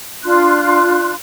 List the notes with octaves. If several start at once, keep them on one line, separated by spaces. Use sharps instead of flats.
D4 F4 C6 F#6